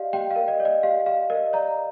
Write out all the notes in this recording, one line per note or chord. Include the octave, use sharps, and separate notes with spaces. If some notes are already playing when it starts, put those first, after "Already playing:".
Already playing: G4 D5 D#5 F5
G4 G5
F5
A#4
D#5
D5
D#5
G4 F5
G4 F5
A#4 D#5
D5 A#5